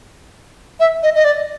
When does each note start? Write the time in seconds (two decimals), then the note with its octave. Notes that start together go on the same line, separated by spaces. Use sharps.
0.80 E5
1.03 D#5
1.15 D#5
1.25 D5